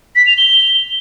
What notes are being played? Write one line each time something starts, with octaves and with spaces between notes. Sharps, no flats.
B6
F7
G7